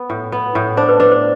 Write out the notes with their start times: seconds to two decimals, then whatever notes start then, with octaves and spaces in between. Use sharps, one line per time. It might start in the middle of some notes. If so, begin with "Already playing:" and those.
Already playing: B3
0.10 A2
0.32 B3
0.55 A2
0.77 D4 C5
0.89 B4
1.00 D4 B4
1.12 C5